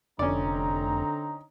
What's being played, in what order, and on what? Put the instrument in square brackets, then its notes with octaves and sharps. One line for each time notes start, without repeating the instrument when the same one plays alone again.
[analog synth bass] F1 [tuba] D3 [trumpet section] C4 D#4 A#5 [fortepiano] C#4 D5